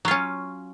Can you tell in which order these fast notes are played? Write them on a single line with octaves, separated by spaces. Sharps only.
F#3 F4 C#4